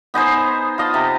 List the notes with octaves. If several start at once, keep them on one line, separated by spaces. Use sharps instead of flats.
B3 D#4 G#4 C5
F4 D#5 A5
C3